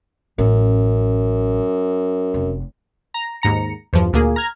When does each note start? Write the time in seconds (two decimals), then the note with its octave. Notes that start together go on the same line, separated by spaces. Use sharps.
0.38 A1 F#2
2.34 F1
3.14 A#5
3.42 D#2 G#2 A#5 C#7
3.93 E2 G2 F3
4.13 D2 A#2 A#3 G#4
4.36 A#5 F6 G#6